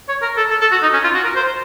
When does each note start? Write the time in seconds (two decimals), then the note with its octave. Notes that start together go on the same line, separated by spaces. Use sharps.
0.09 C#5
0.22 A#4
0.37 A4
0.50 A4
0.61 A4
0.72 F#4
0.83 D#4
0.93 C#4
1.04 F4
1.14 F#4
1.24 A#4
1.35 C5